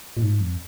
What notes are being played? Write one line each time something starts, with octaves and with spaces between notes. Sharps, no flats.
A#2
G#2
F2